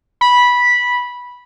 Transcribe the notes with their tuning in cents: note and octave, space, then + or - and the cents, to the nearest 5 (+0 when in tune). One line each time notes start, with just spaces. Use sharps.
B5 -10